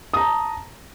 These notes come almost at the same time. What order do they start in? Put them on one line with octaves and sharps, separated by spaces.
D#6 A#5 A5